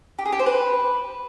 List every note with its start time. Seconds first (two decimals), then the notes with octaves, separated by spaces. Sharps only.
0.19 G4
0.25 G#4
0.32 G4
0.39 C5
0.46 B4